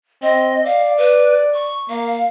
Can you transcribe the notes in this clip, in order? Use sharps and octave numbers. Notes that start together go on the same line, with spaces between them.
C4 D#5
D5 F5
B4
C#6
A#3 F5